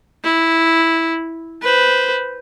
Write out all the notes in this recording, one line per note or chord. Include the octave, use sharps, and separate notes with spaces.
E4
B4 C5